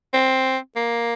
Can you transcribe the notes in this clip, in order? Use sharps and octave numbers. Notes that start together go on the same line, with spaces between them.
C4
A#3